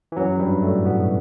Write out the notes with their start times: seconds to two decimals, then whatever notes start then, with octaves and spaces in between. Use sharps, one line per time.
0.12 E3
0.16 F#2 F#3
0.39 G2 G3
0.62 A2 A3
0.85 B2 B3